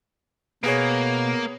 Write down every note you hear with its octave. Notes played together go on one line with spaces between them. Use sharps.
B2 A#3 B3 G#4 C#5